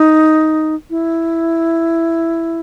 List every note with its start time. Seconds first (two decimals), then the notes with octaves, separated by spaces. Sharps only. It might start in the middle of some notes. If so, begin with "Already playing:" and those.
Already playing: D#4
0.90 E4